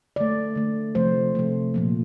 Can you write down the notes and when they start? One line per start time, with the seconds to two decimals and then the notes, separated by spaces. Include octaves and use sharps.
0.16 D3 A3 D5
0.55 D3 A3
0.95 C3 F3 A3 C5
1.35 C3 F3 A3
1.74 A#2 F3 A#3